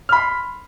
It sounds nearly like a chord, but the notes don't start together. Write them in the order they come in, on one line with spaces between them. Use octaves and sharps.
F6 B5 C6